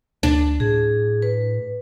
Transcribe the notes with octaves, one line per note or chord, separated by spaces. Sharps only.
D2 D4
A2 G#4
B4